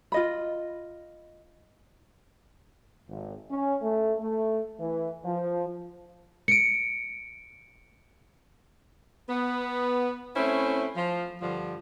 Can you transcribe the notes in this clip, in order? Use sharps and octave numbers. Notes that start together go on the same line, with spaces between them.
F4 D#5 B5
G#1
C#4
A3
A3
E3
F3
C#7 D7
B3
A3 C4 C#4 E4 B4
F3
G2 D3 F3